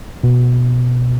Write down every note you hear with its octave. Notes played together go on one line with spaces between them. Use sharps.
B2